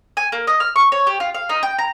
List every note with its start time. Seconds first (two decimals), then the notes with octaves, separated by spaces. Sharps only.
0.17 G#5
0.32 A#3
0.47 D#5
0.60 F6
0.76 C#6
0.92 C#5
1.07 G4
1.20 F4
1.34 F5
1.49 D#4
1.63 G5
1.79 A#5